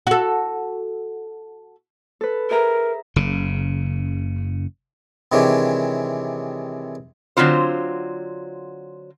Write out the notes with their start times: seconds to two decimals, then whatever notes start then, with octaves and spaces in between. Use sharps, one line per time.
0.07 F#4 A4
2.21 A4 B4
2.51 G#4 A#4 E5 A#5
3.16 F#1 C#3
5.32 C3 D#3 E3 G#3 C#4 D4
7.37 D3 F#3 C4 F4 C5